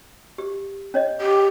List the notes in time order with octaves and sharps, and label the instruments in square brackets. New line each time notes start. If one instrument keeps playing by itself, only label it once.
[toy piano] G4
C#4 C#5 D#5
[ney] G4